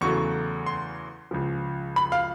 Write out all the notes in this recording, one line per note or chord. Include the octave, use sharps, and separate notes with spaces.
E2 C#3 F#3 A3 C#6
C6
C#2 C#3 F3
B5
F5